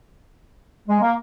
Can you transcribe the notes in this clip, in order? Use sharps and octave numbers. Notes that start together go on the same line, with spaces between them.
G#3
A#3